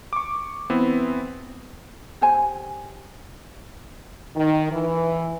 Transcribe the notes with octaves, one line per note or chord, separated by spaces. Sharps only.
C#6 D6
E3 B3 C4 E4
G4 C5 G#5
D#3
E3